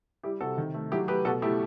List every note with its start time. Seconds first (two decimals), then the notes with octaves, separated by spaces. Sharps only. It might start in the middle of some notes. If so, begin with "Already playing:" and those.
0.23 G3 E4 G4
0.41 C3 F#4 A4
0.58 D#3
0.74 A3
0.92 F#3 E4 G4
1.08 A3 G4 B4
1.25 B2 F#4 A4
1.42 A3 E4 G4